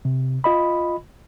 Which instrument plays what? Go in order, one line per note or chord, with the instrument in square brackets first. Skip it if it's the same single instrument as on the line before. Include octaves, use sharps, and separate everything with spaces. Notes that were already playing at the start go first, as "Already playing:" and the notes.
[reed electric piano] C3
F4 D#5 B5